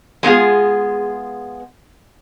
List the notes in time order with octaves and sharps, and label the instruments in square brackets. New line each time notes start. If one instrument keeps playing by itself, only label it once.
[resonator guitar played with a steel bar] G#3 B3 F4 G#4